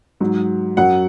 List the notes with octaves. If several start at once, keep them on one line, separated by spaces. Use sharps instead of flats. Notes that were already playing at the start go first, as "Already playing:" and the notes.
G#2 F#3
F#2 F#3 F#5